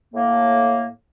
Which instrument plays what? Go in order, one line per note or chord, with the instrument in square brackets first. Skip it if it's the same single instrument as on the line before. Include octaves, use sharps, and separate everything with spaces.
[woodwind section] A2 A#3